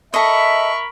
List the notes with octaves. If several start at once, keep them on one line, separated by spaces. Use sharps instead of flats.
A4 A#4 D#5 E5 B5 C#6